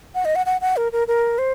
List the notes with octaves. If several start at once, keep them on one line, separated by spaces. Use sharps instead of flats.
F#5
D#5
F#5
F#5
F#5
A#4
A#4
A#4
C5